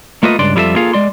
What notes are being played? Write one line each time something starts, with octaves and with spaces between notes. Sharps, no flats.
A3 A#3 F4 A4 B4 D#5
C#2 G2 D4 D5 C6
F2 G3 E4 F4 A4 E5
A#3 F4 G#4 A4 F5
G#3 D5 C6